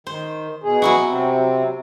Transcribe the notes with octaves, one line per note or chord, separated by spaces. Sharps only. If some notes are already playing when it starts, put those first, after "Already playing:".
D#3 C5
B2 G#4
F#3 E4 F#4
C3 C4